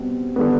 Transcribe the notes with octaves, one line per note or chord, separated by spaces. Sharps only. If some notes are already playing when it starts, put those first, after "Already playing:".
Already playing: B2 G3 C4
D3 G3 B3